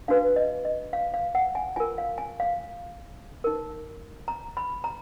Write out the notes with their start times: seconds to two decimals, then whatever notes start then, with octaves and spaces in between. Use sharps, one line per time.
0.08 D4 F#4 B4 F5
0.36 D#5
0.65 D#5
0.93 F5
1.14 F5
1.35 F#5
1.55 G#5
1.76 F4 A#4 G#5
1.98 F5
2.18 G#5
2.40 F5
3.44 D#4 A#4
4.28 A#5
4.57 B5
4.84 A#5